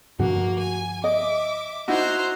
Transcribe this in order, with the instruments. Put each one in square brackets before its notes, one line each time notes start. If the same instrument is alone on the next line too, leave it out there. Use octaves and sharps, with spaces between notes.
[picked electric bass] G2 D3 F3 [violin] A#3 [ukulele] F#4
[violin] G#5
[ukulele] D#5 [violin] E5 D6
[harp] D#4 E4 F#4 [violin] C5 A#5